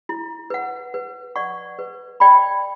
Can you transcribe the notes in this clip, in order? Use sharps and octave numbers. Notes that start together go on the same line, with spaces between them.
E4
B4 F#5
B4
D5 F#5 C#6
B4
D5 G5 B5